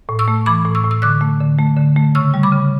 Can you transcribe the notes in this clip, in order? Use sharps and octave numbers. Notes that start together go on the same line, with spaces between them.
A2
C#6 E6
A3
E3 B5 D6
A2
C#6 E6
A2
E6
D3 D6 F#6
A3
D3
A3
D3
A3
C#3 C#6 E6
G3
B5 D6
C#3